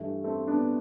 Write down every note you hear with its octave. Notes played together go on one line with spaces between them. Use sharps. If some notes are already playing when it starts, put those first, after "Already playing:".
Already playing: G2 E3 G3 A3
A3 C4
B3 D4